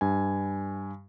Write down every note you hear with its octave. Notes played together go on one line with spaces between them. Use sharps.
G2 G#5